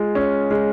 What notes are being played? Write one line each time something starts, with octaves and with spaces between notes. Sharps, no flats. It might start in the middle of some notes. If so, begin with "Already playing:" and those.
Already playing: G#3 F4
C#4
G#3